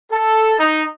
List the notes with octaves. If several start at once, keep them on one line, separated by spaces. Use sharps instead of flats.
A4
D#4